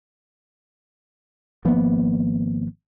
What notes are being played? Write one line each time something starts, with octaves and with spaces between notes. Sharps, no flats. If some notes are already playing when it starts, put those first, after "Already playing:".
G#1 F3 A#3 B3